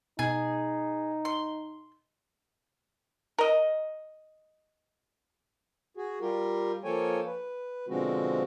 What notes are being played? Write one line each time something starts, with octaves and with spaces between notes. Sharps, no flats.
B2 D#4 G#4
C6
A#4 D#5
F#4 G#4
G3 F4 G4 A#4
F3 A#3 A4 C#5 G5 G#5
B4
B2 D3 F3 G#3 C4 F#4